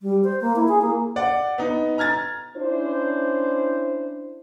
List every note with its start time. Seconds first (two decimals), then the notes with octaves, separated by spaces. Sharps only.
0.02 G3
0.24 C5
0.41 A#3
0.56 E4
0.68 G#4
0.81 A#3
1.16 D5 F#5
1.58 B3 D#4
1.98 A#5 F6 G#6 A6
2.56 C#4 D4 E4 C5